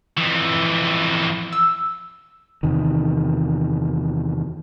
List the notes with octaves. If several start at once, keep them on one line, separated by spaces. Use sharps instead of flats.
F2 E3
E6
E2 C3 D#3